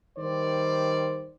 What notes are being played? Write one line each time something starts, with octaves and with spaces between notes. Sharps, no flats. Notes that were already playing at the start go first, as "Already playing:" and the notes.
D#3 G3 C5 D5